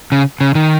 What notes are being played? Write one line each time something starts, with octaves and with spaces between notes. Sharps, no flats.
C#3
C#3
D#3